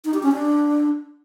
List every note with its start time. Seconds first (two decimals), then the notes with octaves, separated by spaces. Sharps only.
0.05 D#4
0.14 G4
0.23 C#4
0.32 D4